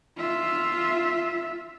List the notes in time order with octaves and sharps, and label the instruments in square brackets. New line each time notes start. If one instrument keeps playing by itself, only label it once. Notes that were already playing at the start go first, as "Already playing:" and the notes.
[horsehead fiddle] F4 E5